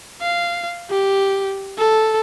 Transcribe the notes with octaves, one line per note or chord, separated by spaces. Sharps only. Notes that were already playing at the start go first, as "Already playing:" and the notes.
F5
G4
A4